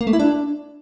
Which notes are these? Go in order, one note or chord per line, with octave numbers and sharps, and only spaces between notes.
A#3
A3
E4
D4